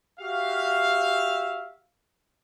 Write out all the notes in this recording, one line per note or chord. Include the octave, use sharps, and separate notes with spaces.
F#4 G4 E5 F5